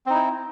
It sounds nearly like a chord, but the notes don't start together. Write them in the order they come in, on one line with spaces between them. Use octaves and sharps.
C4 D#4 E4